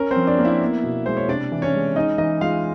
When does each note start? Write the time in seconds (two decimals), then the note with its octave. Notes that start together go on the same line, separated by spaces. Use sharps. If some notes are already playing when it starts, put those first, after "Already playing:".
Already playing: C#4 A#4
0.11 C4 C5
0.16 F3
0.27 D4 D5
0.39 A#3
0.44 E4 E5
0.61 B3
0.83 B2
1.06 G#3 C5
1.17 C#5
1.28 C3 D4 D5
1.52 E3
1.62 C#4 C#5
1.74 G#3
1.96 C#4 D#4 D#5
2.18 E3 D#4 D#5
2.41 G#3 F4 F5